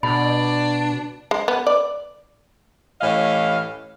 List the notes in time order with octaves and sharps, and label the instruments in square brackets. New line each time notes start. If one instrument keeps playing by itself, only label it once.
[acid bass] B2 [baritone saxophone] D4 [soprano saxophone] D5 [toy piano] B5
[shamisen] G#3
B3
D5
[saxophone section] A2 E3 C#4 G4 D#5 F5